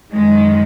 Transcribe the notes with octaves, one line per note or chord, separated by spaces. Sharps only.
F#2 D#3 G#3